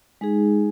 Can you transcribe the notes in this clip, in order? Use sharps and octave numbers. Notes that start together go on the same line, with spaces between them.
G#3 D#4 G#4